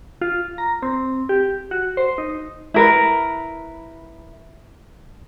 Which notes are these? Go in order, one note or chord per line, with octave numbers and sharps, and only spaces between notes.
F4
A#5
C4
G4
F#4
C5
D#4
E4 A#4 B4